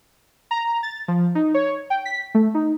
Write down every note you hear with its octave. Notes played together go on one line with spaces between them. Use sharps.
A#5
A6
F3
D#4
C#5
G5
B6
A3
D#4